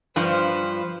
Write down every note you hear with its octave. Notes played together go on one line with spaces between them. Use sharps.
G2 F3 B4 C5